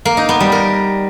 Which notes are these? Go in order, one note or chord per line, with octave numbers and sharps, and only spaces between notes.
A#3
D#4
B3
G3
A#4